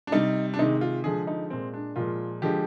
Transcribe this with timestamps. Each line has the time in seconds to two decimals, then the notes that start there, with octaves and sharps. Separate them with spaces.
0.07 D4
0.12 C3 G3 D#4
0.54 D4
0.59 C3 D#3 G#3 D#4
0.81 F4
1.04 D3 F3 G#3 G#4
1.27 D#4
1.50 A#2 G#3 C4
1.74 D4
1.96 A#2 F3 G#3 F4
2.42 D3 F3 G#3 G4